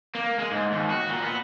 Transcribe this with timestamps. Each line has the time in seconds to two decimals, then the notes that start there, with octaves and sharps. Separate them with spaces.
0.15 A#3
0.39 G#3
0.52 G#2
0.73 D#2
0.90 F#4
1.09 A#2
1.23 B3